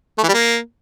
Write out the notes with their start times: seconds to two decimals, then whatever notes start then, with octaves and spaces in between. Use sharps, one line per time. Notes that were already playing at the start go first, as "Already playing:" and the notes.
0.18 A3
0.23 E3
0.29 G3
0.34 A#3